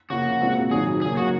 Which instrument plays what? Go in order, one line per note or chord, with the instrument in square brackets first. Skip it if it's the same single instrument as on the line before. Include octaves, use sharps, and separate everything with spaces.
[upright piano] C#3 F3 A#3 [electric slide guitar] F#4
[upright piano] A#2 G#3 C4 F4
[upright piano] G#1 G#2 F#3 [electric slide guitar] G#4
[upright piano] C#3 F#3 A#3 [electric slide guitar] G#4
[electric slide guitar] F#4